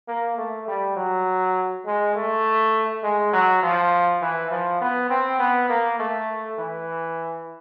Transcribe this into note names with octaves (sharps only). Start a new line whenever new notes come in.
A#3
A3
G3
F#3
G#3
A3
G#3
F#3
F3
E3
F3
B3
C4
B3
A#3
A3
E3